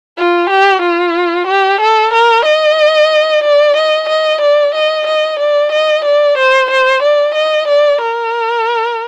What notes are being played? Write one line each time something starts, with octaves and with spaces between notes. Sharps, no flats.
F4
G4
F4
G4
A4
A#4
D#5
D5
D#5
D#5
D5
D#5
D#5
D5
D#5
D5
C5
C5
D5
D#5
D5
A#4